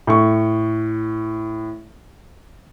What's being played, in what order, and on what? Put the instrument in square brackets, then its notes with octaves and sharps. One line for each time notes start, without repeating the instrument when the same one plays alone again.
[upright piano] A2 C#6